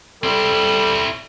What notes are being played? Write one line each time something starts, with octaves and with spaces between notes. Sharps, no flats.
G3 C4 E4 A4